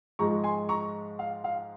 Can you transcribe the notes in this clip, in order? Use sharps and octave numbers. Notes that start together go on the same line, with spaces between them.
G#2 F3 G#3 A#5 C#6
G#5 C6
A#5 C#6
F5
F5